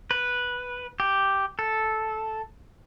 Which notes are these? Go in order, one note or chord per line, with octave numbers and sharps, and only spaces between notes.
B4
G4
A4